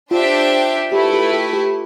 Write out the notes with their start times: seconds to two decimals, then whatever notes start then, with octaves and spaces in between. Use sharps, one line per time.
0.11 D4 F4 G4 C5 E5 G5
0.92 A3 E4 G4 B4
1.13 G4
1.33 G4
1.53 G4